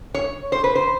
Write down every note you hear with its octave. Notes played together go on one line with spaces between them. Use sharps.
C#5
C5
B4
C5